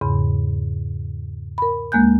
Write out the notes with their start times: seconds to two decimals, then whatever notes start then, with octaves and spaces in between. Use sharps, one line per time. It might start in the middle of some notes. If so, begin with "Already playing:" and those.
0.01 E2 G#2 C#3 B5
1.58 A#4 B5
1.92 D2 G#3 A#3 G#5 F#6 G6